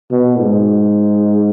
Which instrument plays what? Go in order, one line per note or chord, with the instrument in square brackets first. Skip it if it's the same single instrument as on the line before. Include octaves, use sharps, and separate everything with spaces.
[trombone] B2
G#2